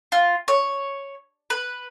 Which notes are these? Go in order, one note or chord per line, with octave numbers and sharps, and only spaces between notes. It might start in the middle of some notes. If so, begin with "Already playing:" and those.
F4
C#5
B4